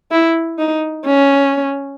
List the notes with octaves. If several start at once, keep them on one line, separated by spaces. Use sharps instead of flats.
E4
D#4
C#4